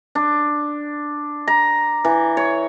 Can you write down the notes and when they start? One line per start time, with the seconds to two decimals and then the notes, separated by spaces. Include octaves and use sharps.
0.15 D4
1.47 A#5
2.05 E3
2.37 C#5